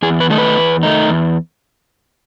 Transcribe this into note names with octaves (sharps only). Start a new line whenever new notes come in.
E2 G#4
B4
D#3 A3 D#4
B4
E2
D#3 A3 D#4
E2